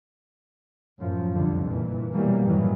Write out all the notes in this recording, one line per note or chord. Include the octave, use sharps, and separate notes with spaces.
F#2 A2 F3
C2 F2 D3 F3
A#2 E3
B2 E3 F#3 G3 A#3
F#2 A2 D#3 E3 F#3